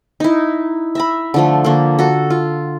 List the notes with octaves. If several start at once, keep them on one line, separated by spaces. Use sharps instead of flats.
D#4 E4
E5 A#5 B5
D3 F3 A3
D3 A#3
F#4 A4
F4